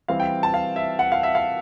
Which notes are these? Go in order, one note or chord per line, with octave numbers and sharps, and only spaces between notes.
E3 G3 C4 F5
G5
A5
F5
E5
F#5
F5
E5
F5